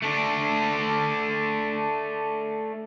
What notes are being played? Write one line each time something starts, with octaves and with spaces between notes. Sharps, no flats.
A3 D4